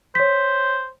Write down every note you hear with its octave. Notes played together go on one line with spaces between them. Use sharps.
C5 C#5 B6